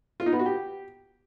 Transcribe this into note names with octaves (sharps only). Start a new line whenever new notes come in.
F4
D#4
B3
F#4
G4